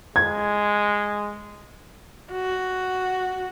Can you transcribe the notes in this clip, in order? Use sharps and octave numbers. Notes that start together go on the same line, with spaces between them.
G#3 G#6
F#4